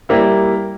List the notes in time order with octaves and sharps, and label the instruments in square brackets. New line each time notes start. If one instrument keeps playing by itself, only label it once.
[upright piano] G3 A#3 E4